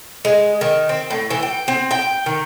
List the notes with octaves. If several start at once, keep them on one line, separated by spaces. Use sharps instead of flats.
G#3
D#3
C4
A2
E3
G5
C4
G5
D#3